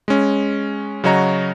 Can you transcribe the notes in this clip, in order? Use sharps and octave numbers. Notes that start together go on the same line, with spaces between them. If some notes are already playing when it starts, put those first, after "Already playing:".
G#3 C#4
C#3 F#3 F#4 C#5 D#5 A#5